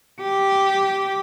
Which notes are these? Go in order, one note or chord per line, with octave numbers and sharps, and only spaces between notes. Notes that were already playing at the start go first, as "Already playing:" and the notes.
G4